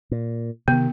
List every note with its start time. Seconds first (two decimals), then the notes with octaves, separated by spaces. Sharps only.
0.11 A#2
0.68 C3 D#3 B3